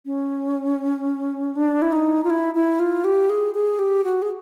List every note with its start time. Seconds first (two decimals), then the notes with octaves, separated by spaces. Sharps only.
0.06 C#4
1.55 D4
1.82 E4
1.92 D#4
2.24 F4
2.30 E4
2.55 E4
2.79 F4
3.04 G4
3.29 G#4
3.54 G#4
3.79 G4
4.04 F#4
4.22 G#4